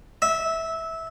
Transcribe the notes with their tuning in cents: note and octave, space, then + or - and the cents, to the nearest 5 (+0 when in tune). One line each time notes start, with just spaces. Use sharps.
E5 -15